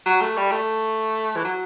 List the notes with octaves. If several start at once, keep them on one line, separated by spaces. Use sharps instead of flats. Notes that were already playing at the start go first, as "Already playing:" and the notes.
F#3
A3
G3
A3
E3
F#3